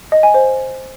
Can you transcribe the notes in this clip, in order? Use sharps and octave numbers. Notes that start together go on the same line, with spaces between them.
D#5
G#5
C5